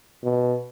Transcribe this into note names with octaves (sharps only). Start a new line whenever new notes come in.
B2